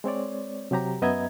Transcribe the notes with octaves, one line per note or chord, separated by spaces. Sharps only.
G#3 C4 C#5 D5
C3 F#3 G4 A#5
F#2 B3 D#5 E5 A#5 G#6